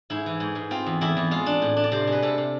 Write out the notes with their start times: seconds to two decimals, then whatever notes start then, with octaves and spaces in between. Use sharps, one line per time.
0.10 G#2 E4
0.26 E3
0.40 G#2
0.55 G#2
0.71 C4 F4
0.86 E2
1.01 E2 E4
1.17 E2
1.31 G#3 F4
1.46 D4
1.62 A2
1.77 D4
1.84 D5
1.92 C3 C5
2.07 G#3 B4
2.23 C3 A4
2.38 C3